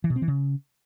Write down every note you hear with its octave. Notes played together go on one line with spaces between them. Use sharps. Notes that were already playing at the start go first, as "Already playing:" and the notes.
E3
B2
C4
E3
C#3